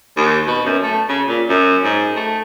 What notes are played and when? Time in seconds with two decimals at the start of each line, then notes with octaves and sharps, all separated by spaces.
0.17 D#2
0.47 B2
0.65 F#2
0.83 A3
1.09 C#3
1.28 A#2
1.49 F#2
1.84 G#2
2.16 A3